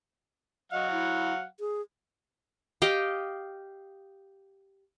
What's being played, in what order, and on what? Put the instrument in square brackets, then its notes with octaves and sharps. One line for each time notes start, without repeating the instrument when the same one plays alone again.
[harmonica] F#3 F5 F#5 [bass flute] D#5
[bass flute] E4
G#4
[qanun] G4 D#5 F5 G5